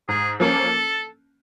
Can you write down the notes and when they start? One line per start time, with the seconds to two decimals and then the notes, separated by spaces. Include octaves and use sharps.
0.09 G#2 G#4
0.40 F3 A#3 C#4 A4